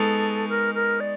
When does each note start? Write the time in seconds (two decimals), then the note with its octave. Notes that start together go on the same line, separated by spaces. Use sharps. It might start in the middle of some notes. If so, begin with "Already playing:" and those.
Already playing: G#3 B3 D#4 F#4 A4
0.49 A#4
0.75 A#4
1.00 D5